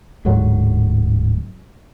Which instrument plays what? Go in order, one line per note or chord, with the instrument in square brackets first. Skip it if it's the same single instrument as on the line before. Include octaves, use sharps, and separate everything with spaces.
[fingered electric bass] D1 G#2 D3 F#3